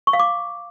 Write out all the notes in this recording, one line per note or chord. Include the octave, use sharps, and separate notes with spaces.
C#6
F5
D6